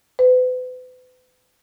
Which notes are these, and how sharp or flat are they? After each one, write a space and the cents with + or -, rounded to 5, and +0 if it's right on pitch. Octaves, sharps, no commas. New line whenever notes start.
B4 +40